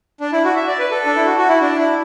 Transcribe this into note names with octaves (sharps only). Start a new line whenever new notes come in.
D4
E4
F#4
E5
D5
B4
A4
D4
E4
F#4
F#4
E4
D4
E4